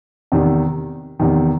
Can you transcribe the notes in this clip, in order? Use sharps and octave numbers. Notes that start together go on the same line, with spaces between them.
E2 C3 D#3
E2 C3 D#3